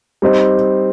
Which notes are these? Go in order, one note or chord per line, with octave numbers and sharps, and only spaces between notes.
G3 C4 D#4